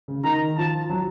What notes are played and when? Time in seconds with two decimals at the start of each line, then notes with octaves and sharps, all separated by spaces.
0.08 C#3
0.24 D#3 A#5
0.57 F3 A5
0.89 F#3